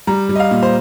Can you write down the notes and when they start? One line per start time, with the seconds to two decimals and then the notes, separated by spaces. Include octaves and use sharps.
0.07 G3 A#5
0.29 G3
0.36 D#5
0.40 F5
0.51 A#2
0.63 C5